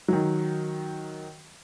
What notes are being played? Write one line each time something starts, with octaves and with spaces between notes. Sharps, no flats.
D#3 F#3